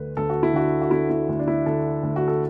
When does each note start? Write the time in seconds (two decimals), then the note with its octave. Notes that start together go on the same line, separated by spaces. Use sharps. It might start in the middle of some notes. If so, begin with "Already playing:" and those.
Already playing: D2 D3 B4
0.17 D2 A4
0.29 F#4
0.43 E4
0.53 D3 F#4
0.82 F#4
0.91 D3 E4
1.10 E4
1.29 D2
1.39 D4
1.48 E4
1.66 D3 A4
2.03 D2
2.16 F#4
2.28 A4